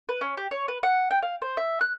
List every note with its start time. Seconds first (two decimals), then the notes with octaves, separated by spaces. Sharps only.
0.09 B4
0.21 C#4
0.37 G4
0.51 C#5
0.68 B4
0.83 F#5
1.11 G5
1.22 F5
1.42 C5
1.57 E5
1.81 F#6